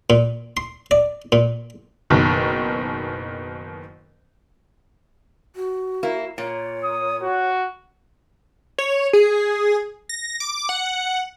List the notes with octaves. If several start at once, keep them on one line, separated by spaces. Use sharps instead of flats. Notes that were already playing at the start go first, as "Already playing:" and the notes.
A#2
C6
D5
A#2
F#1 B2 D#3
F#4
A#3 E4
A#2 C#5
D#6
F#4
C#5
G#4
A#6
D6
F#5